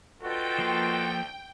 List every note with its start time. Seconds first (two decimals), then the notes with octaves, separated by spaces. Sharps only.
0.22 D2 B2 F4 F#4 A4 G5
0.58 F3 A#3 C6